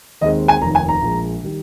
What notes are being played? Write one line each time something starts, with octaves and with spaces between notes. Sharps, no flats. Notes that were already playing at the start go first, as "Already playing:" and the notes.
D#2 D#3 G#3 C4 D#5
G#5
F1 D#2 D#3 A#5
G#5
A#5
A#1 A#2 G#3
D#3 G3